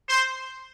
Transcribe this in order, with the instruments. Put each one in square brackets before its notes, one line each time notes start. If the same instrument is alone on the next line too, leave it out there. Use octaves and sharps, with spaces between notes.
[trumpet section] C5